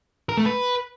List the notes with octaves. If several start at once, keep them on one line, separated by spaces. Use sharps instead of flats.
A#4
A3
B4